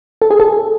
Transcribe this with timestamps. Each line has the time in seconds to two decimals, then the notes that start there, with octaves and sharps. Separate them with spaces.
0.22 A4
0.31 G#4
0.40 A4